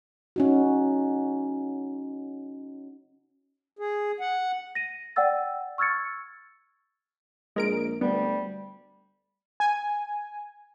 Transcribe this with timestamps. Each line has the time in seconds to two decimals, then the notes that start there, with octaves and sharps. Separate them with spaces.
0.36 C#4 D#4 F#4
3.79 G#4
4.20 F#5
4.75 A#6 D#7
5.16 D5 F#5 G5 E6 A6
5.78 C#6 E6 F6 G#6 A6 C#7
7.56 A#1 G#3 A#4 D7
8.01 D2 G3 B3
9.60 G#5